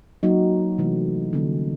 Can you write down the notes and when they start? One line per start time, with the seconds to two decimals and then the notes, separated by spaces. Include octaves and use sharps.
0.23 F#3 A#3 D#4 F#4
0.78 C3 E3 A3
1.33 D3 G3 A#3 C#4 F#4